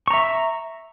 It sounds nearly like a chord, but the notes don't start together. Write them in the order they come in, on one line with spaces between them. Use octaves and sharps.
C#6 A#5 E5